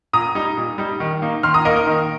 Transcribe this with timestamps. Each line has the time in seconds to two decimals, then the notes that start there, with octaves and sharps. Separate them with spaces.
0.13 A#2 A#5 D#6
0.35 G3 D#4
0.57 A#2
0.78 G3 D#4
1.00 D#3
1.22 A#3 D#4
1.43 D#3 C6 F6
1.54 A#5 D#6
1.65 A#3 A#4 D#5
1.69 D#4
1.76 A#4
1.87 D#3